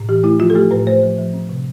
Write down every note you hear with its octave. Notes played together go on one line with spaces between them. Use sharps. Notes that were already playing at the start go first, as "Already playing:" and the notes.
Already playing: A2
E3 G4
A3 E4
F3 F4
A4
A3 G4
A2 B4
A3 C5
F3
F3
C4
C3